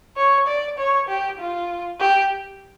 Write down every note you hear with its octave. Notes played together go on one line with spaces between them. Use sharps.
C#5
D5
C#5
G4
F4
G4